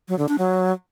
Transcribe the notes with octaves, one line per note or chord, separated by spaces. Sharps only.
F#3
D3
D4
F#3